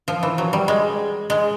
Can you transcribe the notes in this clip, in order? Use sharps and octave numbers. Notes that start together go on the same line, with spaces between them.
F3
E3
F#3
G3
G#3
G#3